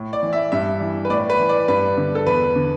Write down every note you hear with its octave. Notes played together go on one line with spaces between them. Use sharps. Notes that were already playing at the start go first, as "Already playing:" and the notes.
Already playing: A2
D5
E3
E5
G2 E5
E3
B4
A2 D5
B4
E3
D5
G2 B4
D3
A4
E2 B4
D3